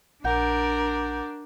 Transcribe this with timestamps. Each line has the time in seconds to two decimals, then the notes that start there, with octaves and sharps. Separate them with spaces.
0.24 A#1 D4 A#4 D5 F#5 G6